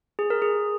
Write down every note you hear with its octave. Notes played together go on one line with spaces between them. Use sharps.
G#4
A#4
G#4